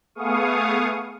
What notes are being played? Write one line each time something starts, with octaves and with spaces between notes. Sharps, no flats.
A3 B3 G#4 F5 C#6 D#6